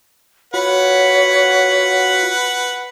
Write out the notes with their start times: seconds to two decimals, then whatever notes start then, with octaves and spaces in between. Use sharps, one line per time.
0.54 F4 F#4 B4 C#5 F#5 B5